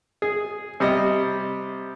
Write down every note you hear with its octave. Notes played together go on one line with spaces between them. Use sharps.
G#4
C3 G3 D#5